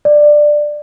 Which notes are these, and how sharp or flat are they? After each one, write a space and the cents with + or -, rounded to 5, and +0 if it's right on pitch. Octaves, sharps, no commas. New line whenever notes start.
D5 +15